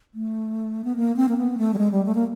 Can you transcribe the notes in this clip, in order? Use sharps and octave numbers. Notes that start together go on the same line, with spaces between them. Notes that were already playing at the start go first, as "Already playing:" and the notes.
A3
B3
A#3
C4
A#3
B3
A3
G3
G#3
G3
A3
A#3